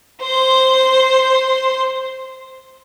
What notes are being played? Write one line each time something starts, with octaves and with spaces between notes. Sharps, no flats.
C5 C6